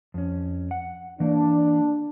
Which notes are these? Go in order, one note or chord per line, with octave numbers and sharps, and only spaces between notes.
F2 C#4
F#5
E3 A#3 D4